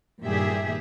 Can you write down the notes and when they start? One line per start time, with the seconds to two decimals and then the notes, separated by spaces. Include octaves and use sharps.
0.23 G2 A#2 D#3 G4 G#4 E5